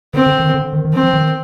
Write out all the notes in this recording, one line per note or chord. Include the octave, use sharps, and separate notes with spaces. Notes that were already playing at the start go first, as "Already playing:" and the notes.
D3 C4
D3
D#3
D3
D#3
D#3
F3 C4
F3
D#3